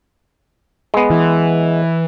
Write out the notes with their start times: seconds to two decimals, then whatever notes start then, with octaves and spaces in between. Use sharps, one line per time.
0.94 G#3 B3
1.10 E3